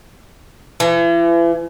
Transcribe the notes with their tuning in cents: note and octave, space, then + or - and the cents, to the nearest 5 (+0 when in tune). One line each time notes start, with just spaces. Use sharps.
E3 +40